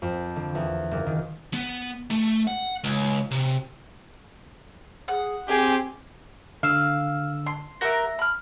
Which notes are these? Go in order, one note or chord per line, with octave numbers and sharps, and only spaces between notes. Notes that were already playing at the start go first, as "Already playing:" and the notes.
F2
D3
E2
F#1
D#3
B3
A3
F#5
C#2
C3
G#4 F#5
C4 G4 G#4
D3 F5 E6
C6
F#4 G4 A#4 E5 A#6
B5 F6